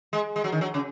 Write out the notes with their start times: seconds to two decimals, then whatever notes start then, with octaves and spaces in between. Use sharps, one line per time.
0.13 G#3
0.36 G#3
0.44 F#3
0.52 D#3
0.61 F#3
0.74 C#3